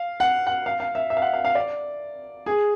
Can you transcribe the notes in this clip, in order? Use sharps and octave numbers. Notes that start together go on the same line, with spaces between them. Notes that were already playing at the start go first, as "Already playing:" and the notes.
Already playing: F5
F#5
F#5
F5
F5
E5
E5
F5
F#5
F5
F5
D5
G#4